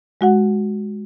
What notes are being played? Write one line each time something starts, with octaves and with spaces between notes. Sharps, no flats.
G#3 F#4 F#5